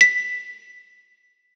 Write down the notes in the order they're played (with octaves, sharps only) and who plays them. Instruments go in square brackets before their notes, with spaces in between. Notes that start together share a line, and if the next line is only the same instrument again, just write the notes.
[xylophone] B6